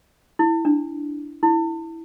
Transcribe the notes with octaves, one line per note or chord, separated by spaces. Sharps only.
E4
D4
E4